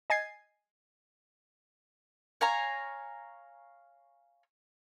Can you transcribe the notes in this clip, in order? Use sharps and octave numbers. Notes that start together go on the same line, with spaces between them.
D#5 G#5 G#6 A6 C7
C#5 F5 G#5 A#5